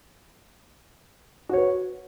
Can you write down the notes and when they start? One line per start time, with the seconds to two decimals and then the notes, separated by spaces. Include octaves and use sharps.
1.49 F#4
1.53 C#5
1.57 B4